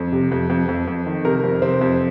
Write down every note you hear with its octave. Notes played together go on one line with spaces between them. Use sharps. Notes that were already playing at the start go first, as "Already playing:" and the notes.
Already playing: F2
C3
F2
F2
F2
F2
D#3
C3 A#4
F2
C3 C4
F2